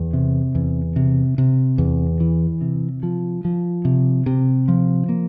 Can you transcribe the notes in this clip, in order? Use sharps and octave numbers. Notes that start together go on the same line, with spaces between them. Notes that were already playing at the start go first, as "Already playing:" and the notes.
Already playing: E2
C3
E2
C3
C3
E2
E3
C3
F3
F3
C3
C3
F3
A#3